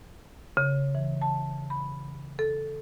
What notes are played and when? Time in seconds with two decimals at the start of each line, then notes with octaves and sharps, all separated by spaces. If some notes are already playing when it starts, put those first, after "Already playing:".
0.57 C#3
0.95 E3
1.22 A5
1.70 B5
2.39 A4